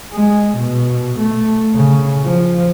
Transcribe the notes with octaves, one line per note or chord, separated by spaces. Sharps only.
G#3
B2
A3
C#3
F3